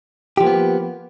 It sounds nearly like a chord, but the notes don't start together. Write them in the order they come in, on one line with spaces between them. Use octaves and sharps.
G4 F3 A#3 B3